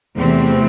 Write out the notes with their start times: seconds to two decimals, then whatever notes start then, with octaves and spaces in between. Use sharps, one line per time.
0.18 E2 C3 E3 A3 C4